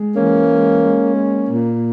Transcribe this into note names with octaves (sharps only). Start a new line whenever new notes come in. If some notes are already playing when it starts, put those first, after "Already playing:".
Already playing: G#3
E3 A#3 C#4
G#3
G#3
A#3
A#2